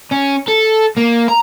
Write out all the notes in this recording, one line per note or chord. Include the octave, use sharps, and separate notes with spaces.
C#4
A4
A#3
A#5